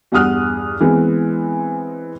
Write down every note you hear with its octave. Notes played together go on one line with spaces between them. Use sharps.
E2 G2 F#5 D#6 F6 F#6
E3 G#3 B3 C4